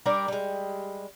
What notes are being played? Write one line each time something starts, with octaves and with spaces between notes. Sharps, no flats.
G3 D4 A#4 D5
G3 G#3